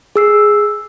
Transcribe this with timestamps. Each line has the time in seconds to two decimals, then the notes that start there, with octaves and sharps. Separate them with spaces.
0.16 G#4 E6 C7